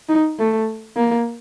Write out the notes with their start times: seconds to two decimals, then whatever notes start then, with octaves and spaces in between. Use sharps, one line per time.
0.09 D#4
0.39 A3
0.97 A#3